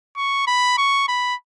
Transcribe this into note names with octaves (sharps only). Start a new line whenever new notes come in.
C#6
B5
C#6
B5